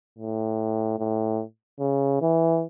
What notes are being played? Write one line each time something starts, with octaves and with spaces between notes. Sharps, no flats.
A2
A2
C#3
E3